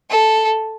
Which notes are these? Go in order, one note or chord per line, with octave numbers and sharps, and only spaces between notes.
A4